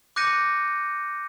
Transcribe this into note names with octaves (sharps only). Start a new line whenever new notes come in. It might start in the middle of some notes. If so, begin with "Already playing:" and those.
D6 F#6 G6 A#6 C#7 D#7